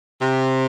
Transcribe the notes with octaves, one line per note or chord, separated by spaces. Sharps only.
C3